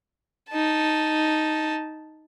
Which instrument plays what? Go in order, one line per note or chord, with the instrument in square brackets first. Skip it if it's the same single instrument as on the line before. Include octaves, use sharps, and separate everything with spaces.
[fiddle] D#4 A5